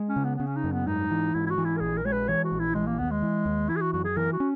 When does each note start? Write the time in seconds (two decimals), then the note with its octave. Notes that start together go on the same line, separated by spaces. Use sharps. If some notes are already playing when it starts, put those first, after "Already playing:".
Already playing: G#3
0.09 C#4
0.16 C#3
0.25 B3
0.36 C#3 B3
0.47 C#4
0.57 D#4
0.64 F#2
0.72 B3
0.87 G#2 D#4
1.11 E3
1.34 G#2 E4
1.46 E4
1.51 F#4
1.58 E3
1.65 E4
1.77 A#4
1.81 A#1 G#4
1.98 A#4
2.05 G#3 C#5
2.13 B4
2.28 E3 C#5
2.44 F#4
2.52 A#1
2.60 E4
2.75 E3 G#3
2.87 A#3
2.99 D#2 B3
3.11 G#3
3.22 E3
3.46 D#2
3.69 E3 E4
3.76 G#4
3.82 F#4
3.93 F#2 F#4
4.05 G#4
4.17 E3 A#4
4.33 F#4
4.40 C#4